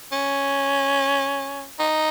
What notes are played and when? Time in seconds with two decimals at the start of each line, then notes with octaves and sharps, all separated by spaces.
0.12 C#4
1.79 D#4